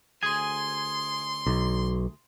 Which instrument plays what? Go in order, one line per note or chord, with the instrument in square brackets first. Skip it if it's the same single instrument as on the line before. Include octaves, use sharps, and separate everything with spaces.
[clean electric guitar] D2 G#4 G#5 [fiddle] C6
[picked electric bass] B1